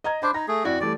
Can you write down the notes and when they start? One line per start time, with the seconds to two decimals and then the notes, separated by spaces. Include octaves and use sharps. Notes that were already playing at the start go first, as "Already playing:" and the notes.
0.04 D#5 A#5 G#6
0.23 D4 C5 B5
0.34 D#4 A#6
0.48 A3 G#4
0.65 F2 E4 F#4 D5
0.81 E3 G3 A3 D5